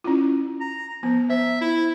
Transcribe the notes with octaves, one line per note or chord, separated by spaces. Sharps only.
C#4 E4 F4
A#5
F3 B3
C5 E5
E4